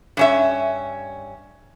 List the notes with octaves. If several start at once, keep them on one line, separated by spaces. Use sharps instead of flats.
G2 C#4 E5